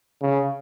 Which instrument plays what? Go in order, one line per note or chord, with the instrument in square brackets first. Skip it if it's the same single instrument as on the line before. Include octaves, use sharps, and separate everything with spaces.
[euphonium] C#3